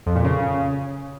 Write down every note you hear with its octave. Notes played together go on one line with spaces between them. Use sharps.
F2
A#2
C#3